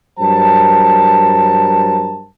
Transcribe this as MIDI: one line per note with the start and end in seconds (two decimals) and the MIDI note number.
0.19 2.27 43
0.19 2.27 54
0.19 2.27 70
0.19 2.27 72
0.19 2.27 81